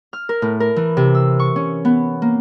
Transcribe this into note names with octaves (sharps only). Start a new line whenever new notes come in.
F6
A#4
A2
A#4
E3
C3
E6
C#6
C#4
B3
A#3